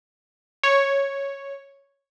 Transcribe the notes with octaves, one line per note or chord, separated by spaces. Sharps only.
C#5